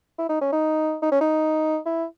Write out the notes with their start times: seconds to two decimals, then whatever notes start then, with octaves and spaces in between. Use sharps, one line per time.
0.18 E4
0.29 D#4
0.41 C#4
0.52 D#4
1.02 D#4
1.12 C#4
1.21 D#4
1.86 E4